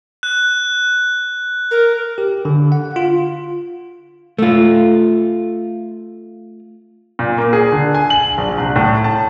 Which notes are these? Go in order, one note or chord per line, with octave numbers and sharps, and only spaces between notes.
F#6
A#4
G4
D3
F#5
F4
A3 F4
A#2
A#3
G#4
D3
G#5
F#7
A#1
C2
A2
A5